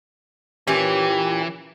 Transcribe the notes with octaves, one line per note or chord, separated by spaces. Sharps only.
A#2 E3 C#4 G4